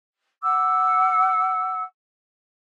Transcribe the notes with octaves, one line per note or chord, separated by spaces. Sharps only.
F#5 D6 E6